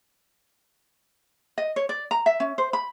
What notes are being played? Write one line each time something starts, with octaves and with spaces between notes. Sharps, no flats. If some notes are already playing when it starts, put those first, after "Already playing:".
D#5
C#5
D5
A#5
E5
C#4
C5
B5